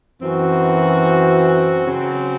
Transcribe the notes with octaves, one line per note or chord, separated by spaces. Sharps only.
F#2 E3 C4 F#4
C#3 F#3 C4